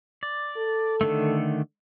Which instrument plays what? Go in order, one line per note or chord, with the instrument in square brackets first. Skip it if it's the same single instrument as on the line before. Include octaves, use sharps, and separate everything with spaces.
[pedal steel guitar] D5
[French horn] A4
[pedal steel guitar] D3 D#3 A3